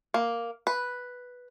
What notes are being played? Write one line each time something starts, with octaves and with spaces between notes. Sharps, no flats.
A#3
B4